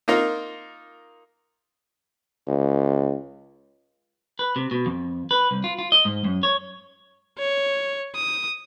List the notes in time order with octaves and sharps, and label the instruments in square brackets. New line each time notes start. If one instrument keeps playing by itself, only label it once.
[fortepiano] A#3 D#4 F4 A#4
[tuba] C#2
[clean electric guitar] B4
C3
B2
F2
B4
C2
F4
F4
D#5
G#2
F#2
C#5
[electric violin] C#5
D#6